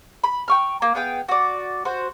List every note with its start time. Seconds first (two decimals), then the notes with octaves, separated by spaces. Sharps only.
0.24 B5
0.48 G5 C#6 F6
0.82 A#3
0.95 B3 G#4 F5 G5
1.28 F#4 D5
1.85 F#4 C5